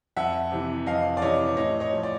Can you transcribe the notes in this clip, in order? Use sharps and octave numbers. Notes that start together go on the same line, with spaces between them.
F2 E5 F#5
C3 E3
F2 D#5 F5
D5
C3 E3 C#5 D#5
A2 C#5 D#5
C#5 D#5
F3
D5